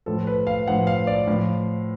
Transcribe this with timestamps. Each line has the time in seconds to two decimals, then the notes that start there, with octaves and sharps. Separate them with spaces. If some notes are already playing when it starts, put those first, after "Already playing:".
0.06 A2 F3 A4
0.27 B4
0.47 F5
0.67 A2 F3 F#5
0.87 F5
1.07 D5
1.27 A2 F3 F5